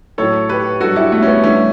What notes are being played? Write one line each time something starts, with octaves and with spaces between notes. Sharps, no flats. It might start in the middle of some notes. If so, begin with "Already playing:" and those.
A2 F#3 A4 C#5
G4 B4
G2 F#3 F#4 A4
E4 G4
A3
C#4
B3
G2 E3 G3 A3 C#4